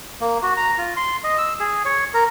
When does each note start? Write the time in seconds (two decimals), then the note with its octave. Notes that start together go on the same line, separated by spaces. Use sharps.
0.21 A#3
0.42 F#4
0.57 A#5
0.78 F4
0.97 C6
1.24 D#5
1.38 E6
1.60 G#4
1.85 C#5
2.14 A#4